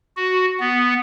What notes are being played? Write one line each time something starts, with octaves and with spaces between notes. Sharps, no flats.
F#4
B3